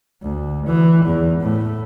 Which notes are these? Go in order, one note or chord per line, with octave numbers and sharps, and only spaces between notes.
D2
E3
E2
A2